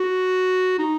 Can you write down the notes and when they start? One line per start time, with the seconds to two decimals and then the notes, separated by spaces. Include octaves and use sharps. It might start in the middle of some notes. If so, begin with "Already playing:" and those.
Already playing: F#4
0.79 D#4